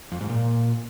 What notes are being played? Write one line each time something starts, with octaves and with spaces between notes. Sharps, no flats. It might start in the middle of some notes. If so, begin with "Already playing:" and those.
F2
G#2
A#2